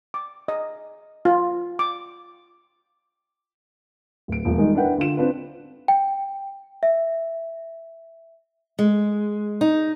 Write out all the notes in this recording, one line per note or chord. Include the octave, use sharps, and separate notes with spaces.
D6
D#5
F4
D6
D1 D7
E1 F3
D#3 G3 G#3 D#4
D4 E4 A#4 B4 F#5 G5
D3 F4 E7
C4 D4 F4 B4
G5
E5
G#3
D#4